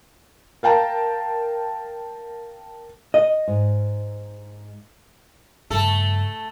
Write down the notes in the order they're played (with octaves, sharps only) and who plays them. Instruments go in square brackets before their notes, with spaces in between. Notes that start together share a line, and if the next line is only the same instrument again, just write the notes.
[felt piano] A#4 F5 G5 A5 A#5
[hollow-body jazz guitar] D#5
[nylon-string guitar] G#2
[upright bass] G2 C#3 [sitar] A3 A4